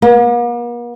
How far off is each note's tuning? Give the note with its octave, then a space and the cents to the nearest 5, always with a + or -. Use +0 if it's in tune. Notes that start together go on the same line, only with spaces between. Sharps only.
A#3 +45